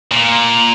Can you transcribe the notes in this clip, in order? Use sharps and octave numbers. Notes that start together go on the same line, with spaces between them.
A#2